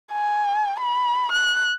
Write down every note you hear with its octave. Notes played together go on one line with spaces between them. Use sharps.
G#5
B5
F#6